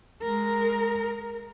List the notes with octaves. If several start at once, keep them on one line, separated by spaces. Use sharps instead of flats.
G#3 A#4